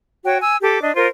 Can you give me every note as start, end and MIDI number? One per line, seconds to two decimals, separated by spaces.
0.24 0.39 66
0.24 0.39 73
0.24 0.39 79
0.41 0.56 80
0.41 0.56 88
0.62 0.79 67
0.62 0.79 69
0.62 0.79 86
0.82 0.94 62
0.82 0.94 75
0.96 1.06 65
0.96 1.06 70
0.96 1.06 72